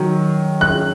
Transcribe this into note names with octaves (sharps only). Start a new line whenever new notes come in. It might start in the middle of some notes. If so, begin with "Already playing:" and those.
Already playing: D#3 F#3
F#6